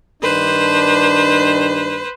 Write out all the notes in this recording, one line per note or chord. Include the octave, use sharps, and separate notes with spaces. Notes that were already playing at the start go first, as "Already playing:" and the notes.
G2 D#3 D4 B4 C5